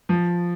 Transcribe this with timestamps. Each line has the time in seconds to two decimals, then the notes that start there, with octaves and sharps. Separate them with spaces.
0.09 F3